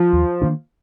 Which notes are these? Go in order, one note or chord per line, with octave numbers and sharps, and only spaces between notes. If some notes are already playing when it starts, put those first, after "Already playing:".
Already playing: F3
D#2
D#3 A#3 D4